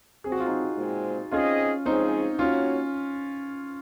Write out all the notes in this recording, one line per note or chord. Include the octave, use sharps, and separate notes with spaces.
C3 F#3 C4 G#4
F#4
F4
D#4 F#4
A#2 G#3 C4
C4 C#4 D#4 F4 G#4 D#5
F3 G#3 C4 C#4 D#4 G#4
A#3 C#4 D#4 F4 F#4 C#5